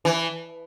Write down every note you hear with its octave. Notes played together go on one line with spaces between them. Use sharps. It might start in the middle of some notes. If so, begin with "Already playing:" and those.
E3